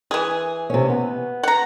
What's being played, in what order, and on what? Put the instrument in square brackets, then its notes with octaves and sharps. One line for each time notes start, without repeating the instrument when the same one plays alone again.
[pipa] E3 G#4
[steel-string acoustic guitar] C3 C#4
B3
[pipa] F#5 A#5